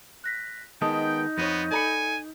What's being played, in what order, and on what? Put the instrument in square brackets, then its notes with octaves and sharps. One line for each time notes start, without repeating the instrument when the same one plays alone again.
[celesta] F#6 A#6 B6
[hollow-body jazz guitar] D#3 G#3 B3 [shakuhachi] D#4 [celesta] D#5 A5 D#6 [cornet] G5
[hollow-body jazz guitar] F2 C#5 [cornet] B3 [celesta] A#6 D#7
[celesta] A4 C#7 [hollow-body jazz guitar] D5 A#5 B5 [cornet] G#5